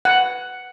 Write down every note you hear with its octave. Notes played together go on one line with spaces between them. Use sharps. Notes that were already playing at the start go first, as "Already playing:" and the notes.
F#5